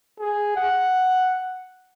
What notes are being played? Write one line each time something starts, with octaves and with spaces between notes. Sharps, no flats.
G#4
F#5